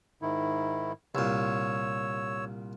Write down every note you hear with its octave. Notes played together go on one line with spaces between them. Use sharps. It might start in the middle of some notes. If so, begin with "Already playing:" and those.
G#2 D#3 E4
C2 A#2 C#5 E6